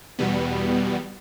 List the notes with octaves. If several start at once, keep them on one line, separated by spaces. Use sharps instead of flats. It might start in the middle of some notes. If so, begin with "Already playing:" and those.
E2 B2 G3 B3